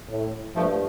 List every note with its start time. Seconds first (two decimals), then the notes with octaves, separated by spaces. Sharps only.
0.10 A2
0.55 G2 F3 A3